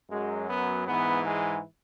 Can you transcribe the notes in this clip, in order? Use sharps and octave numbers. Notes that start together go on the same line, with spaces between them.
F#2 F#3 G#3
B3
G#2 E3 B3
G#3